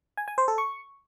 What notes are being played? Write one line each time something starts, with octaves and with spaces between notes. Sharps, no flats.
G#5
G#5
C5
A4
C#6